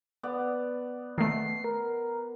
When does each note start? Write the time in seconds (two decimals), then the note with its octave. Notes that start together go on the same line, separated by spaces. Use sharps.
0.23 B3 D5
1.18 D#3 A3 C7
1.64 A#4